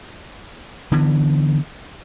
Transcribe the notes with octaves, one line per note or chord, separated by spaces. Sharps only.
D3 E3 B3